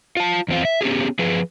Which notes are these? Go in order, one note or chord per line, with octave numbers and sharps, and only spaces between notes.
F4 A5
E2 C4 F4
E5
B3 C#4 G4 G#4
F3 G#4 B4